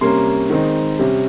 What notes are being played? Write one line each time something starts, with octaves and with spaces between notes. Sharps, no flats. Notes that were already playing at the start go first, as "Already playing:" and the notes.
C3 G3 A#3 C#4 C6
D#3 G#3 C4 D#4
C3 G3 C#4